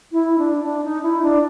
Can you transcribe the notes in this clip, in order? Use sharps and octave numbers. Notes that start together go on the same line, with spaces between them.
E4
D4
D4
D#4
E4
D4